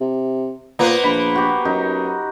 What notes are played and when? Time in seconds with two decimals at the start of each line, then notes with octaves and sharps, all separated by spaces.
0.01 C3
0.79 A#2 A#3 B3 B4 C5 A#5
1.04 A#1 B5
1.35 F#4 G4
1.65 F#2 D#4